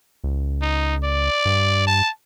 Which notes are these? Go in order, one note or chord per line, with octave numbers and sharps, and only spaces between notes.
C#2
D#4
D5
G2
A5